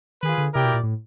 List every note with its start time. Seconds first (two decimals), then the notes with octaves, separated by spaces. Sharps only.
0.22 D#3 F4 G#4 B4
0.38 D3
0.53 C3 E4 G4 A#4 D5 G5
0.64 B2
0.74 A#2
0.83 A2